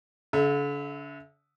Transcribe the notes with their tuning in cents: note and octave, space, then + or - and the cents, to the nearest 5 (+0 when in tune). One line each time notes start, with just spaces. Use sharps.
D3 -45 E5 +0